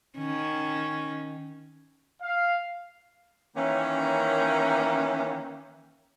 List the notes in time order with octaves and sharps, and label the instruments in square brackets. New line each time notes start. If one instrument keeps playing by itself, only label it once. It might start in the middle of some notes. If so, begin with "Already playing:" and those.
[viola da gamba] D#3 C#4
[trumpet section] F5
[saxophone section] D#3 E3 A#3 C#4